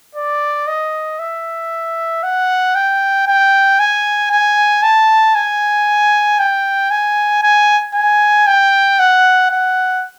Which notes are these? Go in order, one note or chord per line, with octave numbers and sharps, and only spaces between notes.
D5
D#5
E5
F#5
G5
G5
G#5
G#5
A5
G#5
G5
G#5
G#5
G#5
G5
F#5
F#5